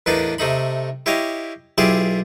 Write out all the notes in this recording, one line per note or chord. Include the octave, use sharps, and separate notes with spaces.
E2 A2 A#3 D4 D#4 B4
C3 A3 D#4 B5
E4 G4 C#5 D#5 F5
B1 E4 F4 G4 G#4 D5